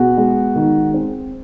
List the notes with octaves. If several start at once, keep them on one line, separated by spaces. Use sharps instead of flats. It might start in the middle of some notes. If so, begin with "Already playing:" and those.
Already playing: B2 B3 F#4 G#4
G#3
D#3
C4